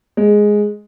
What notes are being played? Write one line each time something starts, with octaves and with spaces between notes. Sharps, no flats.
G#3